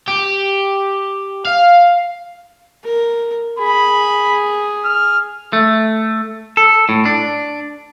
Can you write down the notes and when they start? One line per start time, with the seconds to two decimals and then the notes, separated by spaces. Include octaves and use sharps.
0.08 G4
1.45 F5
2.84 A#4
3.59 G#4 B5
4.85 F6
5.53 A3
6.57 A4
6.89 A2
7.05 D4